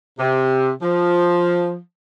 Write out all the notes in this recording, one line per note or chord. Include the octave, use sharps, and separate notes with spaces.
C3
F3